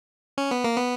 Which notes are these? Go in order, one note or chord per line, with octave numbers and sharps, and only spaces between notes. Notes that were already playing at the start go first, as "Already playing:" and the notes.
C#4
B3
A#3
B3